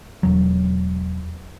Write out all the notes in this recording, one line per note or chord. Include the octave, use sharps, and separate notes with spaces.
E1 F#3